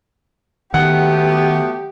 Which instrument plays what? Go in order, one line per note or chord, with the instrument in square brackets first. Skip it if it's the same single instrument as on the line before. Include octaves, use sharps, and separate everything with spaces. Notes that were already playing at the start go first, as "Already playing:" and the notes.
[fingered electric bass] D#3 [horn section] F#3 A3 B3 [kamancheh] G4 [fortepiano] F#5